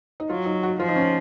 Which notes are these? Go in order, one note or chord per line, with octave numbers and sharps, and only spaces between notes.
D#4
F#3 F4
D#4
F#4
F3 F4
D#4
C#4